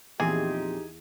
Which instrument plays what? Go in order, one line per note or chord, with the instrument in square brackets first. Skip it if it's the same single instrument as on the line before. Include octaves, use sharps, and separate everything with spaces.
[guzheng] E2 [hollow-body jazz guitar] A#2 F3 C4 [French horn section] D#4 G4 [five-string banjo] G#4